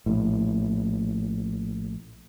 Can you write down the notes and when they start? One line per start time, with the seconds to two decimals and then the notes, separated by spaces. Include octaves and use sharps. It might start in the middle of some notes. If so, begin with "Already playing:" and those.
0.06 A#1 A2